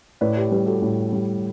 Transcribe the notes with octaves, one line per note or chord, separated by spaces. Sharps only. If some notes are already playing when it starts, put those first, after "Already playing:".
A2 B4 D5
G4 B4
G3 G4 B4
F#4 A4
A2
G3